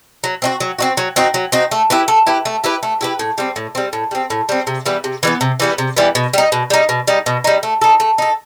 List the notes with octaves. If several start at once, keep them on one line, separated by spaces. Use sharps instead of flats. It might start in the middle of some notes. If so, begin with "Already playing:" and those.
F#3
C4 D#4 F#4
F#3
C4 D#4 F#4
F#3
C4 D#4 F#4
F#3
C4 D#4 F#4
A3
E4 G4 B4
A3
E4 G4 B4
A3
E4 G4 B4
A3
E4 G4 B4
A2
G3 C4
A2
G3 C4
A2
G3 C4
A2
G3 C4
C3
E3 G3 B3
C3
E3 G3 B3
C3
E3 G3 B3
C3
E3 G3 B3
B2
G3 D#4
B2
G3 D#4
B2
G3 D#4
B2
G3 D#4
A3
D#4 A4
A3
D#4 A4